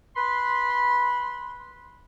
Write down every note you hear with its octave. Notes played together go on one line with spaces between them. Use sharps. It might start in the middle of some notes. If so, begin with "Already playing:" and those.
B4 B5 C6